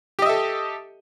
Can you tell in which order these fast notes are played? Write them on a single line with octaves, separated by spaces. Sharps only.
G4 D#5 E5 A4